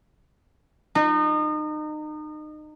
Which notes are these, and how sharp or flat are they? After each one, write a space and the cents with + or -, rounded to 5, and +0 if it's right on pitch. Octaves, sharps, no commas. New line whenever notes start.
D#4 -30